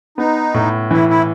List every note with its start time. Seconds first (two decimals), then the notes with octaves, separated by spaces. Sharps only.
0.18 B3 D#4
0.54 A2
0.91 E3 E4
1.10 E4